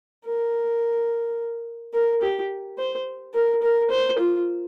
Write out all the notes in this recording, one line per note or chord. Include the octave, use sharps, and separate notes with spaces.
A#4
A#4
G4
C5
A#4
A#4
C5
F4